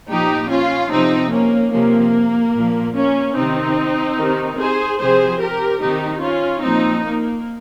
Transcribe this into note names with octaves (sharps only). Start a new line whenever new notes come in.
A#2 F3 D#4 G4
C#4 F4
C3 F3 C4 D#4
A#3 C#4
C3 F3 A#3
A#2 F3
A#3 C#4
C3 D#3 C4 D#4
C3 D#3
G#4 C5
C3 F3 G#4 C5
G4 A#4
C3 D#3 D#4 G4
C#4 F4
A#2 F3 C4 D#4
A#3